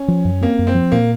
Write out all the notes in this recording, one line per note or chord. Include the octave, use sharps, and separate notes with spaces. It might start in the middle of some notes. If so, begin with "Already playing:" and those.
Already playing: C#4
F3
F#2
A#3 C4
F#2
C4
F3
A#2 A#3